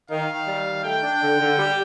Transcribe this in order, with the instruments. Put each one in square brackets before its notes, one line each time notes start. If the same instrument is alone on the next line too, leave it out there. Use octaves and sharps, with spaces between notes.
[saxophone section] D#3 [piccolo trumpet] F5
[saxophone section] D#3
G3
D#3
[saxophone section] A3 [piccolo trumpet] G5
[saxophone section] D4
D3
D3
G3